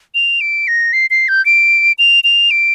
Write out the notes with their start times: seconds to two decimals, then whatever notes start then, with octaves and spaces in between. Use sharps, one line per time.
0.15 F7
0.41 D7
0.68 A#6
0.93 C7
1.10 C7
1.28 G6
1.46 D7
1.98 F7
2.24 F7
2.51 D7